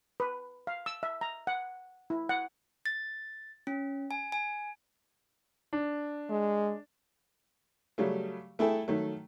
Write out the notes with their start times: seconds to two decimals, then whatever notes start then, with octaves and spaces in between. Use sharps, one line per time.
0.20 B4
0.67 F5
0.86 E6
1.03 E5
1.21 A#5
1.47 F#5
2.10 E4
2.29 F#5
2.86 A6
3.67 C#4
4.11 G#5
4.32 G#5
5.73 D4
6.30 G#3
7.98 C#3 F#3 G3 A3
8.59 A3 E4 G#4 A4 G5
8.88 D#3 F#3 A3